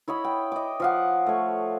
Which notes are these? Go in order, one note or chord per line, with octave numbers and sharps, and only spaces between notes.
E4 C#5 D#5 B5
G5
D#5 D6
F3 F5 F#5
A3 C#5